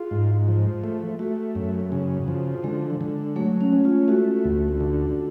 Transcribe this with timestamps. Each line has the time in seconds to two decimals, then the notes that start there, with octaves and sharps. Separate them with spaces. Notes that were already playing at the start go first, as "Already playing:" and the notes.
Already playing: F4 G#4
0.11 G#2
0.48 F3
0.84 A3
1.19 A3 F#4
1.55 F#2
1.92 C#3
2.28 F3
2.64 D3 G#3
3.01 D3
3.36 F#3 A3
3.61 C#4
3.72 C#4
3.85 F4
4.08 A3 F#4
4.44 D2
4.80 D3